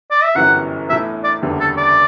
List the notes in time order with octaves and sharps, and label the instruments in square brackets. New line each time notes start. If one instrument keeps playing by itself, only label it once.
[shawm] D5
E5
[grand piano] G1 F#2 E3 G3 B3 [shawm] F#5
[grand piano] A2 E3 B3 [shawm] E5
[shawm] D5
[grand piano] F#1 E2 D3 G3
[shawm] A4
D5